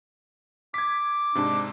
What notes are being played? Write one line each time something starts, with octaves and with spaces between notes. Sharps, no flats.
D6 G#6 B6
G#2 C3 D4